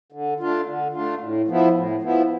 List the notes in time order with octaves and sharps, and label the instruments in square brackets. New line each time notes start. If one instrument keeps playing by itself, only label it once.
[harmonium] D3
A3 D4 F4
D3
A3 D4 F4
A2
F3 B3 E4
A2
F3 B3 E4